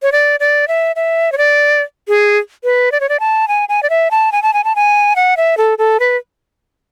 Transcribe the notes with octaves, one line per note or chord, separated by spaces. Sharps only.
C#5
D5
D5
E5
E5
C#5
D5
G#4
B4
D5
C#5
D5
A5
G#5
G#5
D5
E5
A5
G#5
A5
G#5
A5
G#5
F#5
E5
A4
A4
B4